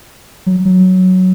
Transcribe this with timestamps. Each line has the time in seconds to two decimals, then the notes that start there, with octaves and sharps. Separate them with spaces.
0.46 F#3
0.65 F#3